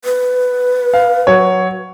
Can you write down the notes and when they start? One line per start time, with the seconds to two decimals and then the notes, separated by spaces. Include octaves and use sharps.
0.05 B4
0.94 F5
1.27 F#3 C#5